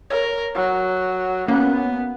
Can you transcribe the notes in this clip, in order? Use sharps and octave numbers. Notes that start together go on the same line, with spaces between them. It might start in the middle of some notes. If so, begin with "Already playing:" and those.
A#4 C#5
F#3
A#3 B3 C#4